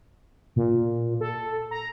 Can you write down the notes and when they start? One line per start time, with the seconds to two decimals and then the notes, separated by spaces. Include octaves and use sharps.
0.56 A#2
1.21 A4
1.71 A#5